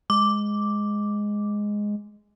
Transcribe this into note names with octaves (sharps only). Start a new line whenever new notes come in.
G#3 D6